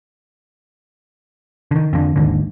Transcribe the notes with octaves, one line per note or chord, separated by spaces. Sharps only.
D3 D#3
F2 D3
G#1 D#2 G#2 D3